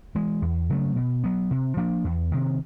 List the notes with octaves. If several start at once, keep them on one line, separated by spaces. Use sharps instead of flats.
E3 G#3
E2
C#3 F#3 A3
B2
F#3 B3
C3
F3 A#3 D4
E2
C3 D#3